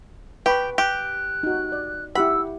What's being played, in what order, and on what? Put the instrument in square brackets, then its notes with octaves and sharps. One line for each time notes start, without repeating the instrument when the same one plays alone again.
[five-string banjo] G4 [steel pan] B4 B5 C#6 [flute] G5
[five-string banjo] G4 [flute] F#6
[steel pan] D#4 F#4
D5
[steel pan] E4 G4 F#5 [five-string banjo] B5 [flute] E6